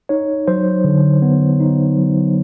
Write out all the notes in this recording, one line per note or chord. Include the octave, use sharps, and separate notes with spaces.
D#4 C#5
F#3 C5
D3
B3
D#4
F#3